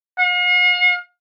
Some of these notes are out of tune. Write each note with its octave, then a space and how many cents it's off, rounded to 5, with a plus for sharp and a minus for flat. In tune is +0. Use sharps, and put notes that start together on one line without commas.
F5 +45